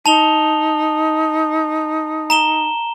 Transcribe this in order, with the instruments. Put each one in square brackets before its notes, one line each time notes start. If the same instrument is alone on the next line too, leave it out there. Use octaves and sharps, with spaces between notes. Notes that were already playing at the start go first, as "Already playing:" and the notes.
[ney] D#4 [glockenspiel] A5 F7 G7
[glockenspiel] A#5 E7 G7